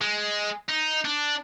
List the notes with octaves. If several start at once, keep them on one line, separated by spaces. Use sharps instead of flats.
G#3
D#4
D4